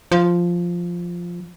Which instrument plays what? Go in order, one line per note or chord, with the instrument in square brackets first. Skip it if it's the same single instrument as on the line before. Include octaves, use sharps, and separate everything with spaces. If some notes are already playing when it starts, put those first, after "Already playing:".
[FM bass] F3